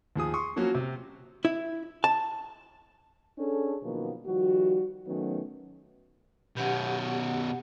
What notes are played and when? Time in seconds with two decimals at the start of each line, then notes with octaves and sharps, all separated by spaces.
0.16 D#2 F3 G#4 D#6
0.34 C6 C#6 D#6
0.56 F3 F#3 A#3 C#4 F#4
0.74 C3
1.45 E4
2.04 A5
3.39 C#4 D4 G#4 A4
3.82 B2 D#3 F3 F#3 A#3 B3
4.26 D#3 F3 G3 F#4
5.07 D#3 F#3 A3 B3 C#4
6.57 B2 C#4 G4 F#5